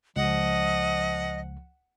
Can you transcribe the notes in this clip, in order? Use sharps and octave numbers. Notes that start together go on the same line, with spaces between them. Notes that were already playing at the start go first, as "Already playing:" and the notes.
C#2 F3 D#5 F#5